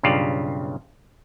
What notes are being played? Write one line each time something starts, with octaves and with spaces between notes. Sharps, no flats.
B1 G2 C#3 F4 G4 D5